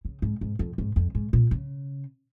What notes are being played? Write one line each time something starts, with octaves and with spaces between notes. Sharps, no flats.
C#3
G#2
G#2
F2
G#2
F2
G#2
A#2
C#3